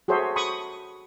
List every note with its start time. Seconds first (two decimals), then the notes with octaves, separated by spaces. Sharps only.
0.08 F#4 G#4 A4 C5 C#5 E5
0.36 B5 C#6 D#6